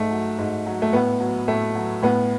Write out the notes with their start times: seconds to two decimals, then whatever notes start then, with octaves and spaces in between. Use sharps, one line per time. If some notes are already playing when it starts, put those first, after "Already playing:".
Already playing: G#2 A3
0.11 F#3
0.38 G#2
0.66 F#3
0.82 A3
0.93 A2 B3
1.20 F#3
1.48 A2 A3
1.75 F#3
2.02 A2 B3